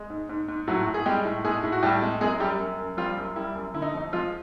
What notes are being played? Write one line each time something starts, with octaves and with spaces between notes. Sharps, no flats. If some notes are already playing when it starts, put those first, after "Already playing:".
Already playing: G#3
G#2
G#2
G#2
A2 F#3 F#4
A2
G#4
G3 G#3 G4
A2
A2 G#3 G#4
A2
F#4
A2 G3 G4
G#3
F#2 G#3 G#4
F#2 G3 G4
F#2
F#2
F3 G3 F4
F#2
G3 E4
F#2
D3 E4
D#4
F2 D#4
F3 G#3 F4